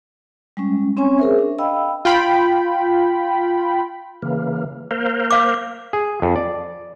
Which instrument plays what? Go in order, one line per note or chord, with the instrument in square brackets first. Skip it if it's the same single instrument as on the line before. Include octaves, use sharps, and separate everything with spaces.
[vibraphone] G3 G#3 C#4
C4 C#4 C#5 G#5 C#6
G#4 A#4 C5 E5
D4
D#5 F5 G5 B5 E6
[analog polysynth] F4 G5 B5
[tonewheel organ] C#3 E3 A#3
A#3 A#4 C5
[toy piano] F5 D6
[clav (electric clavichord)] G#4
F2
D5